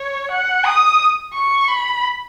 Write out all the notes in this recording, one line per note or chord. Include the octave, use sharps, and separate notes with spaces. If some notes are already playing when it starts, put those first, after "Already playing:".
Already playing: C#5
F#5
D#6
C#6
B5